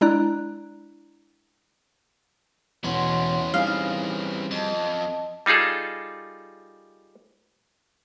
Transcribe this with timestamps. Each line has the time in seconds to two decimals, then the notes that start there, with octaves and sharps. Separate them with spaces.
0.01 G#3 D4 E4 D5 A#5 F#6
2.84 E2 B2 E3 C#4 C#5 F#5 C6
3.54 G3 C4 D#4 G#4 F5
4.51 F2 D#5 A5
5.46 G3 D#4 F4 G#4 A4